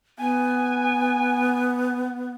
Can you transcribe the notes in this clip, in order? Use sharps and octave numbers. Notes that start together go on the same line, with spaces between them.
B3 G#5